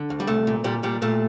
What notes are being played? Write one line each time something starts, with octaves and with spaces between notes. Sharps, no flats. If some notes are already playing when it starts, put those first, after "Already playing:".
Already playing: D3
D2
G3
C2 A3
A#2
A#2 G3
A#2 G3
A#2 A3